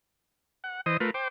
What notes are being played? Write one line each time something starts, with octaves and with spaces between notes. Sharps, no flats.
F#5
E3 C5 D#5 D#6
A3 F4 A#4 B4
C5 G5 D6